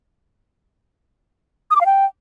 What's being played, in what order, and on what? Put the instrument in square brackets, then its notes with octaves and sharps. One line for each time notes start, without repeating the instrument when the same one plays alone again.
[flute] D#6
D6
F5
G5